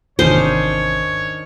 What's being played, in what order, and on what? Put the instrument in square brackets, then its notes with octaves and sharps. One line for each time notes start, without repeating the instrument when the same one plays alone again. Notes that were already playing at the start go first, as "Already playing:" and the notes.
[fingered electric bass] G#1 E2 C3 [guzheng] D#3 C#4 D4 [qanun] C5 [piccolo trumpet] C#5